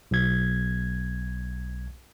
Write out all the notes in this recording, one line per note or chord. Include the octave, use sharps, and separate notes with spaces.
B1 G#6